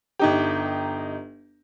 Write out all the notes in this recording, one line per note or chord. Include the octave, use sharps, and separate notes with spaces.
G1 D#4 G4